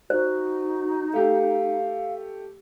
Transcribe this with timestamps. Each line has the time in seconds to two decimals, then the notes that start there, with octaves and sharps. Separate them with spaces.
0.10 D#4 F#4 C5
1.13 A3 G4 F5